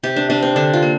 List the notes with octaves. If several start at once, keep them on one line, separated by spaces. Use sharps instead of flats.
C3 G4
D4
C3 D4
C4
D3 D4
F4
A#3